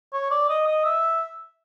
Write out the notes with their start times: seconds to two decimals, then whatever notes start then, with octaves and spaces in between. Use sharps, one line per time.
0.13 C#5
0.31 D5
0.49 D#5
0.67 D#5
0.85 E5